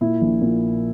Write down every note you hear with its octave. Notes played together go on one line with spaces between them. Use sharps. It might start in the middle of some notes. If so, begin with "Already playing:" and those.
A#2 E4
A#1
A#2